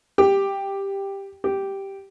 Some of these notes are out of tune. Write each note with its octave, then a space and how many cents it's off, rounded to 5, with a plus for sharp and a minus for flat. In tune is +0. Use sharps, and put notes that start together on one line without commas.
G4 +5
G4 -5